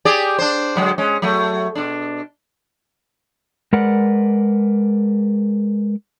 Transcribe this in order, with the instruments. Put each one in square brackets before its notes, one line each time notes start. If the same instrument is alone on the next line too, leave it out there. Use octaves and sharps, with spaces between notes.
[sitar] G4 G#4 D5
D4 C5
D3 F#3 G#3
G#3 C#4
F#3 A3
B2 D4
[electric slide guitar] G#3 A#4 B4 D5 F#5